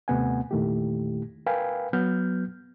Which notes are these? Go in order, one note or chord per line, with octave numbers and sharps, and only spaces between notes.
D#2 C3 A3 B3 F#5 G#5
E2 A#2 D#3 A3 E4 G4
A#4 B4 F5 G5 G#5
F#3 B3 F6 G6